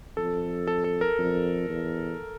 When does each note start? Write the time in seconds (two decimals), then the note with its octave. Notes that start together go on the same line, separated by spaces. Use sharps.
0.17 F2 A4
0.67 A4
0.84 A4
1.01 A#4
1.19 F2
1.69 E2